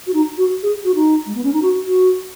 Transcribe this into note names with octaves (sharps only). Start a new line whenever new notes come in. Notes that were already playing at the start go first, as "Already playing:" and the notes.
F#4
D#4
F#4
G#4
F#4
D#4
G#3
B3
C#4
D#4
F#4
F#4